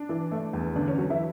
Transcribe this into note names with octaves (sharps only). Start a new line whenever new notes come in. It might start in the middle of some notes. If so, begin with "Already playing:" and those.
Already playing: D4
E3
A3
E2
D3 D4
C#4
F#3
E3 E4